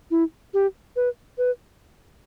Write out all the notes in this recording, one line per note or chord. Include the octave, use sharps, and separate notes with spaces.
E4
G4
B4
B4